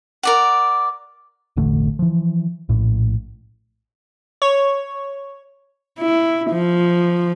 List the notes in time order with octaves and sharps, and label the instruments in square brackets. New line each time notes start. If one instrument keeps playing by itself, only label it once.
[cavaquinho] A#4 D5 F#5
[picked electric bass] E1 A1 D3 A3
E3 F3
A#1 A2
[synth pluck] C#5
[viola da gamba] E4
F3